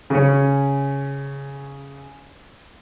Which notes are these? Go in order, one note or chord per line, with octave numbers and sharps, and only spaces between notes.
C#3 C#4